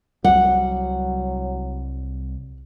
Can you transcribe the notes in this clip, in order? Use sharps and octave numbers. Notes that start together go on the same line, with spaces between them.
C2 F#3 G3 F#5